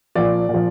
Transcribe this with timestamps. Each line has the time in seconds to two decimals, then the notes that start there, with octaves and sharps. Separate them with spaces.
0.15 A#2 F3 D5
0.49 A#2 F3